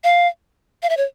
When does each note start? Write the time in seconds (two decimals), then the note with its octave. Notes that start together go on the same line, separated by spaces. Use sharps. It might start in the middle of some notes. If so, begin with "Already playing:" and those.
0.04 F5
0.83 F5
0.89 E5
0.97 C#5